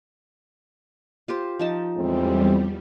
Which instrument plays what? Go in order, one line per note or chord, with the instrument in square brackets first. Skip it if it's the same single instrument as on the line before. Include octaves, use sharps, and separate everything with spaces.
[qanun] F4 G4 C5
F3 D#4 A5
[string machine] E2 G3 [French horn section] A2 G#3 C4